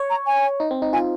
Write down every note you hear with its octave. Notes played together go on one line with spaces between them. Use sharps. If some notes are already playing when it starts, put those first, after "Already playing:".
Already playing: C#5
A#5
G#5
D#4
C4
D#4
F4 G#5